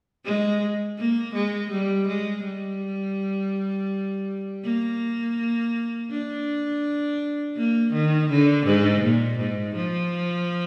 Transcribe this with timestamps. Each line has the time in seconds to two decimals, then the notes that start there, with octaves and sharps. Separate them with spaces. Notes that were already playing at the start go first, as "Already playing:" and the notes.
0.25 G#3
0.98 A#3
1.34 G#3
1.71 G3
2.07 G#3
2.45 G3
4.64 A#3
6.10 D4
7.56 A#3
7.93 D#3
8.29 D3
8.66 G#2
9.03 A#2
9.39 G#2
9.76 F3